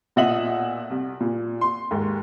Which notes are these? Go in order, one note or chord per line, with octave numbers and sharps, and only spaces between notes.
B1 A#2 D#5 E5 F#5 F#7
C2
A#2
C6
D#2 G#2